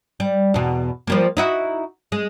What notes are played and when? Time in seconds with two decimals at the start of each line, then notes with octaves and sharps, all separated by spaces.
0.20 G3
0.54 E2 B2
1.07 F3 G3 A#3
1.37 D#4 E4 F#4
2.12 G#3